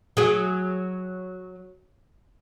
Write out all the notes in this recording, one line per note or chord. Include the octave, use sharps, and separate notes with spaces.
F#3 G#4